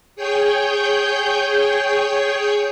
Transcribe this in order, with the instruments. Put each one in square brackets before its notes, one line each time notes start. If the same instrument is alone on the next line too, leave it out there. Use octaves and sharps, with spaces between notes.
[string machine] G#4 C#5 G5 G6